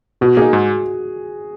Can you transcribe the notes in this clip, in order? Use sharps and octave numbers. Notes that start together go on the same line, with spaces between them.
B2 F#4
A#3 D#4 G#4
G#2